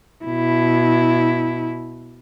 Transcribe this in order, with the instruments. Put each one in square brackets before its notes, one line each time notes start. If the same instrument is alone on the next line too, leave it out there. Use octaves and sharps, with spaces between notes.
[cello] B2 E4